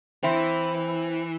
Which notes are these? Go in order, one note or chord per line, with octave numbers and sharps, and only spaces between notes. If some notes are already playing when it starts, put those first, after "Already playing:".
E3 C4 E4